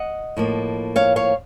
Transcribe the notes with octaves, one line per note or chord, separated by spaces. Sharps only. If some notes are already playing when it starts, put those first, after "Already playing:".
Already playing: D#5 F#5
A2 F3 A#3
C#5 F5
C#5 F5